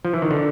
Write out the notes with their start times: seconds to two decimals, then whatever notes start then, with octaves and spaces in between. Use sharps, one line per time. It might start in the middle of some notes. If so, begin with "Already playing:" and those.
0.05 F3
0.14 E3
0.22 D#3
0.31 D3